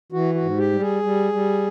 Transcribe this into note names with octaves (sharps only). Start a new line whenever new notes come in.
E3 F#4
F#4
G#2
G4
G3
G#4
G3
G3